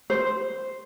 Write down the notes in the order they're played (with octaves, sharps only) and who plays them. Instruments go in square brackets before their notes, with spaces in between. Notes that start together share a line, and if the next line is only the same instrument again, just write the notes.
[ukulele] C5